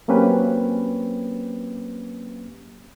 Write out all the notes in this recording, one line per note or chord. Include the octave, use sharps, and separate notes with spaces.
F#3 A#3 C4 C#4 G4 B4